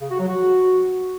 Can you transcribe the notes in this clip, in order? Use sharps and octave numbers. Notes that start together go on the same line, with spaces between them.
C#3
F#4
F#3
F#4